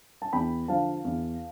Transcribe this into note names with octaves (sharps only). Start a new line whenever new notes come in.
A5
E2 G5 B5
D3 F3 F5 A5
E2